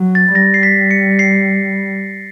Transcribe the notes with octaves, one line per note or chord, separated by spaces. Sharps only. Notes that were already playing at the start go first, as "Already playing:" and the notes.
Already playing: F#3
A6
G3 A#6
C7
B6
C#7
C7